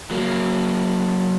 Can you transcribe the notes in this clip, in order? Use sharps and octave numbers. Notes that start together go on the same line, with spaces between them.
F#3 A#3